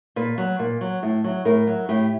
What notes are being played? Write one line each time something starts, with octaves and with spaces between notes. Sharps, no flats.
A#2 B4
F#3
A#2
F#3
A2
F#3
A2 A#4
F#3
A2 G4